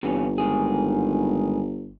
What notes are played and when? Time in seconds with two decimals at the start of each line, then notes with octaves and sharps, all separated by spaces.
0.03 G1 C3 E3 C#4
0.38 G#2 D#3 G#4